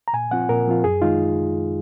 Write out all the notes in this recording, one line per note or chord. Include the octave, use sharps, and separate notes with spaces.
A#5
A#2 G#5
F3 C4 F4 F#5
A#2 A#4
F3 C4 F4
F#2 G#4
D#3 G#3 D#4 F4